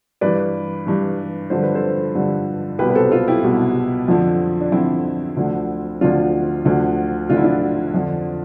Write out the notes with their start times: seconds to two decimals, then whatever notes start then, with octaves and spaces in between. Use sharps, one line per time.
0.21 G2 E3 B4 D5
0.87 G2 E3
1.50 G2 D3 F3 C5
1.63 B4
1.75 A4 C5
2.15 G2 D3 F3
2.79 C2 B2 G4 B4
2.90 B4
2.95 A4 C5
3.11 F4 A4
3.27 E4 G4
3.44 C2 B2
4.08 F2 D3 F3
4.61 D4
4.72 F2 D3 F3 C4 E4
5.37 D2 D3 F3
6.01 D2 D3 F3 D4 F4
6.65 D2 D3 F3
7.29 D2 D3 F3 F4
7.37 E4
7.43 D4 F4
7.94 F2 D3 F3